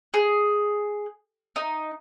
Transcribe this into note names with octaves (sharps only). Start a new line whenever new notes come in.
G#4
D#4